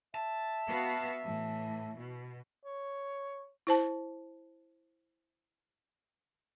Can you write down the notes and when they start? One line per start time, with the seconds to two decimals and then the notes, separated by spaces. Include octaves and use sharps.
0.15 E5 A5
0.67 B3 F#4 F5
1.24 A2 E3
1.97 B2
2.65 C#5
3.67 E4 C5 A5